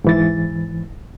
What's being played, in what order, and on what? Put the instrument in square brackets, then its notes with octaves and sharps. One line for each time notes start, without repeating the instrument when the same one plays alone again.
[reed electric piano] G#2 E3 A6